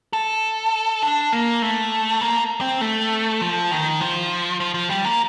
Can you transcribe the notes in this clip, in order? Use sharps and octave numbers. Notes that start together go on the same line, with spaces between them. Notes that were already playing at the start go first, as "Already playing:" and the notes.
A4
D4
A#3
A3
A#3
C4
A3
F3
D#3
F3
F3
F3
G3
A#3